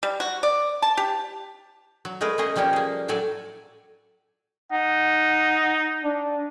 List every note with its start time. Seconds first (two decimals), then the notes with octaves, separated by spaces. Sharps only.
0.03 G3
0.20 F#4
0.43 D5
0.82 A5
0.97 G4
2.05 F#3
2.21 G#3 A3 G#4 A#4 B4
2.38 A3 A#3 C#4 G#4 D#5
2.56 F3 G3 A#3 C#4 G4
2.73 A#3 G#4
3.08 A2 F#3 A4 D5 G#5
4.72 D#4 F#5
6.04 D4